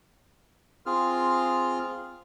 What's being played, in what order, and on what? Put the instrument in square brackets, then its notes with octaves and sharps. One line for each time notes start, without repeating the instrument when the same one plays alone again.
[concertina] C4 F4 G#4 F6